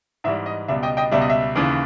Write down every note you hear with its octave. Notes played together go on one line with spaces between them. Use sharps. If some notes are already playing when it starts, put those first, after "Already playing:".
G#2 E3 G3 E5
D#5
C#2 B2 G3 E5
D#5 G5
D#5 G5
C#2 B2 G3 E5
D#5
E5
D#2 C#3 E3